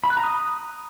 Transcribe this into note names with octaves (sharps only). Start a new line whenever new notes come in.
B5
F#6
A#5
D#6